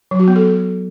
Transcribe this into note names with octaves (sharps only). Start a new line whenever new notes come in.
F#3
F#4
B3
A4